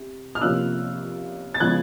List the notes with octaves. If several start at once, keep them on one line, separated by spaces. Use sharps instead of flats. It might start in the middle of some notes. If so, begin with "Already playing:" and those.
Already playing: C3
F6
C3 F3 A#3 C#4 F4 E6 F#6
A6
C#3 F3 G#3 B3 F#6 G#6